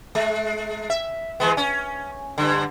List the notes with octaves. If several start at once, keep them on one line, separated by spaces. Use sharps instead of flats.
G#3
E5
E3 G#3 B3
C#4
G2 D3